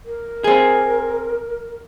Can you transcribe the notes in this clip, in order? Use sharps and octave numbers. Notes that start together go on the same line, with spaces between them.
A#4
C4 G#4